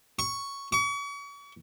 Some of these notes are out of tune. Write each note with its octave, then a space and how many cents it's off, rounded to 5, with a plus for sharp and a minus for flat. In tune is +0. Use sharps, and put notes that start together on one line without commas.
C#6 +5
C#6 +40